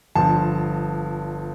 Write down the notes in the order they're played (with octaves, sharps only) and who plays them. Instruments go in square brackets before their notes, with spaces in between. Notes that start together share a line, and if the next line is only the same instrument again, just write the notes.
[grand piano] G1 G2 F3 A5